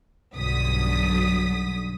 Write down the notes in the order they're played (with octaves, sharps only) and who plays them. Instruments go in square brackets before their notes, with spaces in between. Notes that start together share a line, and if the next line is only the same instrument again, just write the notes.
[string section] B1 G2 D3 F#3 D#6 B6